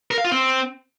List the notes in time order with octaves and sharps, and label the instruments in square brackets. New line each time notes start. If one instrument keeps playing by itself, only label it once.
[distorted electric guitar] A#4
F5
F4
C4